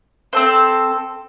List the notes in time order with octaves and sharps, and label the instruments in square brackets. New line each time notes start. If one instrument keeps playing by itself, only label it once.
[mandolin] C4 A4 C5